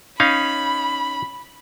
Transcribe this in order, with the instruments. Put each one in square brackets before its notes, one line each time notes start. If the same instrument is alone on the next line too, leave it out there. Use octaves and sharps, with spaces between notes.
[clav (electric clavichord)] C#4 D#4 F5 [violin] B5